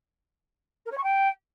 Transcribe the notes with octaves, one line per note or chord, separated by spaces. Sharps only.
A#4
C#5
C#6
G5